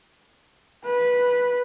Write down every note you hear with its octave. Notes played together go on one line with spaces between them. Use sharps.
B4